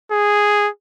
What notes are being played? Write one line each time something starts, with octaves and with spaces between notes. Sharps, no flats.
G#4